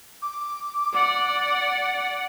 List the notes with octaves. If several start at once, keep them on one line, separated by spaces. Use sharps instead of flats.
D6
D5 F#5